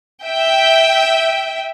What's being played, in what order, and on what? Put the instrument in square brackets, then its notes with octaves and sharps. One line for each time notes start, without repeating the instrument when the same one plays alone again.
[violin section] E5 G5